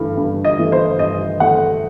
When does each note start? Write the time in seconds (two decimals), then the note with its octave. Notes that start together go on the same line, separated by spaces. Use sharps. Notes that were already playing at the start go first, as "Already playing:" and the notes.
Already playing: G2 E3 A3
0.17 G2
0.45 D#5
0.59 E3 A3
0.72 C5
0.99 G2 D#5
1.40 E3 A3 F#5